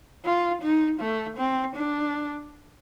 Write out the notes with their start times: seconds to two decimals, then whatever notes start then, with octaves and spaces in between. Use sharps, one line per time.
0.25 F4
0.62 D#4
1.00 A3
1.38 C4
1.76 D4